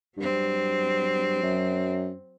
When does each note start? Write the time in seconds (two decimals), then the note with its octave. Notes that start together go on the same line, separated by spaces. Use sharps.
0.18 G2 F#3 C4
1.43 F#2